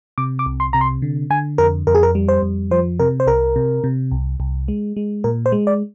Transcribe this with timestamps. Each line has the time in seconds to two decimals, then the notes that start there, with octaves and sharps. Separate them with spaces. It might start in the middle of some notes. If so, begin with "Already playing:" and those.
0.18 C3 D6
0.39 D6
0.46 C2
0.60 C6
0.73 C3 A#5
0.81 C6
1.02 D3
1.30 D3 G#5
1.58 F2 A#4
1.87 F2 A#4
1.95 G#4
2.03 A#4
2.15 G3
2.29 C5
2.43 F2
2.71 F3 C5
3.00 C3 A#4
3.20 C5
3.27 C2 A#4
3.56 C3
3.84 C3
4.11 C2
4.40 C2
4.68 G#3
4.97 G#3
5.24 A#2 A#4
5.46 C5
5.52 G#3
5.67 D5